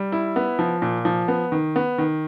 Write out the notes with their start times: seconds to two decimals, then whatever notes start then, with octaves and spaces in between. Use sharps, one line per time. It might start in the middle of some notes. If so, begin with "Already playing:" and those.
Already playing: G3
0.12 E4
0.36 B3
0.59 F3
0.82 A#2
1.05 F3
1.28 B3
1.52 D#3
1.76 B3
1.98 D#3